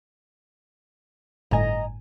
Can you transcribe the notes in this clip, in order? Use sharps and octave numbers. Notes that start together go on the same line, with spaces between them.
G1 A2 D#5 G#5 A#5